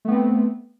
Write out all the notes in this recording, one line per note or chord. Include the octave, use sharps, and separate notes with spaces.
A3 B3 C4